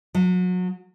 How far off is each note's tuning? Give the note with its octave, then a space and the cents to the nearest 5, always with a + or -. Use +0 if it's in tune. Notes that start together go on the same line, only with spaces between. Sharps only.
F#3 -30